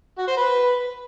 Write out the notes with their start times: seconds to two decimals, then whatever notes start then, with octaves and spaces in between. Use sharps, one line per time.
0.18 F#4
0.28 C5
0.37 B4